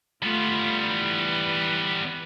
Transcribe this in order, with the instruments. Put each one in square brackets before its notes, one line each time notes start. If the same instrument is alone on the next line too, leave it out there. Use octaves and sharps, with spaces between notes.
[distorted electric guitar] G3 B3 [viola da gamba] A3 F4
[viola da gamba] E3 B4